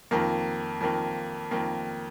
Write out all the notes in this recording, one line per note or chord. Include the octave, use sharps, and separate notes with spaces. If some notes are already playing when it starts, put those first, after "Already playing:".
F2 D#3 A#3
F2 D#3 A#3
F2 D#3 A#3